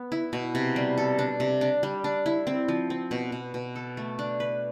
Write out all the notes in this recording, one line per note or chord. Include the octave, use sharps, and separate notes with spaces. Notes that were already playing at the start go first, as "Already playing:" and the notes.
Already playing: B3
E4
B2
C3
G3
A4
D4
C3
D4
G3
D4
E4
C4
F3
C4
B2
B2
B2
A4
A3
D4
B4